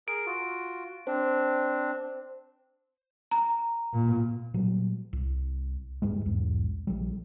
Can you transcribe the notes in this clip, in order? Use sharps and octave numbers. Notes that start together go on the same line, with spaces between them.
G#4 A#4 D7
F4 F#4
C4 D4 C5
A#5
A#2
A#2 F#3 G3
C2
D#1 G2 G3 G#3
B1 E2 G#2
A#1 F3 G3